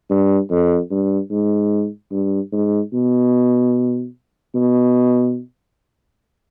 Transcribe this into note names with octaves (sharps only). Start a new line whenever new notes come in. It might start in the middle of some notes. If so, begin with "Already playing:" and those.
G2
F2
G2
G#2
G2
G#2
B2
B2